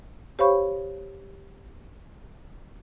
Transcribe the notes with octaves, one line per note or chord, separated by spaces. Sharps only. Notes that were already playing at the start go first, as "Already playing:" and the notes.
G4 C5 C#5 F5 B5 C#6